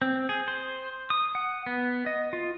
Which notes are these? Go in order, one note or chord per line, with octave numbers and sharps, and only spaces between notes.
C4
G#4
C5
D#6
F#5
B3
D#5
F4